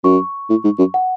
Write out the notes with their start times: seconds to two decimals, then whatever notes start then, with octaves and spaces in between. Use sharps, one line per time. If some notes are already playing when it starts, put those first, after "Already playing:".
0.04 F#2 C#6
0.50 A2
0.64 G#2
0.79 F#2
0.94 F#5